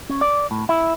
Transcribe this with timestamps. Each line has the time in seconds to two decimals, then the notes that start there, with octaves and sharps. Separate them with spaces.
0.10 C#4
0.21 D5
0.51 A2
0.69 E4